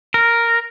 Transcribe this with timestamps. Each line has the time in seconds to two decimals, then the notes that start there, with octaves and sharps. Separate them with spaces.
0.14 A#4